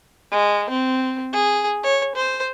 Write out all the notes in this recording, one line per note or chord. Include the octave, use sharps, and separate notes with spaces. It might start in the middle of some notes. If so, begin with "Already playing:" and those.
G#3
C4
G#4
C#5
C5